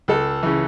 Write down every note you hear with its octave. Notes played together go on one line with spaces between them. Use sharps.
C#2 A4
C#3 E3